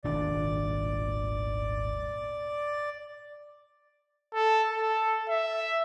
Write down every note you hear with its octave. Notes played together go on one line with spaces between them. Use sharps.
D#1 G#1 D4 D5
A4
A4
E5